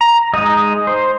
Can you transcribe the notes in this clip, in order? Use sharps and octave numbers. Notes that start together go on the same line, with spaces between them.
A#5
G#3 D#4 D#5
C5